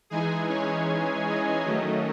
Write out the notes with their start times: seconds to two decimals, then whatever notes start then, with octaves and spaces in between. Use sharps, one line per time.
0.10 E3 G#3 D#4 G#4 G#5
0.49 C#4 C#5
1.26 D#4 D#5
1.65 D#3 F#3 A3 C#4